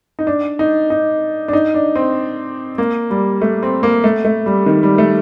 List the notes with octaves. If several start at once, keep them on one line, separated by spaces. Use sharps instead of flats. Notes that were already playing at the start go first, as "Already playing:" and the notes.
D#4
D4
D#4
D#4
D4
D#4
D4
C4
A#3
G3
A3
C4
A#3
A3
A3
G3
D#3
G3
A3